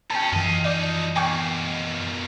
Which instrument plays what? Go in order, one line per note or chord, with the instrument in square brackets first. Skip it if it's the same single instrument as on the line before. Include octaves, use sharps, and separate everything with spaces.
[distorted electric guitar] E2 C#4 [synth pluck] G5 A5
[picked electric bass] F#2 E3 [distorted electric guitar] F4 D#5
[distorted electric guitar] F3 D#4 [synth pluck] D5
[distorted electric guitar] B2 A#3 [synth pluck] G5 G#5 C#6